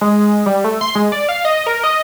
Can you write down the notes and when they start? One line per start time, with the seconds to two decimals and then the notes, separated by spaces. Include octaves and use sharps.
0.01 G#3
0.46 G3
0.64 A3
0.81 C6
0.95 G#3
1.12 D5
1.29 F5
1.45 D#5
1.66 A#4
1.84 D#5